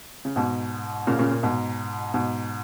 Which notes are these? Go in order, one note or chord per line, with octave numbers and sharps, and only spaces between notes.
C#3
G#2 B2
A#2 C#3
A#2 C#3
A#2
G#2 B2
G#2 B2